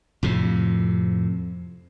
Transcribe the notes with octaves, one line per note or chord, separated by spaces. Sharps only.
F2 A2 C3